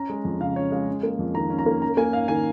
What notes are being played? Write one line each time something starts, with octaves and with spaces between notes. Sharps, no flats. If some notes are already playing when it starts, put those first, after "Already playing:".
Already playing: C#4 A#5
G#3
F2
C#3 F5
C#4 C#5
G#3 F5
C#4
A#3
F2
D#3 A#5
C#4
A#5
A#3
C#4 A#5
A#3 G#5
G#2 F5
D#3 G#5